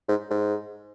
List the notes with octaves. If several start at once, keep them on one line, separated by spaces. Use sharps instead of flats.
G#2
G#2